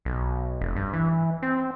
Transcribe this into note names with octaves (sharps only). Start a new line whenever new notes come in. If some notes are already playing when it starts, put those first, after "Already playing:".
B1
F1
G2
E3
C4